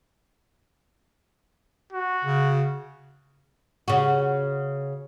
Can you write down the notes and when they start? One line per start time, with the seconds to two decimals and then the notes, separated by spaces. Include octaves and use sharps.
1.93 F#4
2.25 C#3
3.88 C#3 F#4